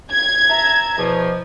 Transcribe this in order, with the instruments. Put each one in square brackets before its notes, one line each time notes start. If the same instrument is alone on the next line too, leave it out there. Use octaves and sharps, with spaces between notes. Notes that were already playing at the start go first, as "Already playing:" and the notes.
[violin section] G#6
[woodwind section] E5 A5 A#5
E2 B2 F3